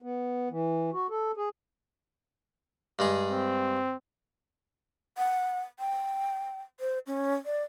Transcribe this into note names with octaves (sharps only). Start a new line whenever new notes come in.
B3
E3
F#4
A4
G#4
G2 G#3 G#4
C4
F#5
G5
C5
C#4
D5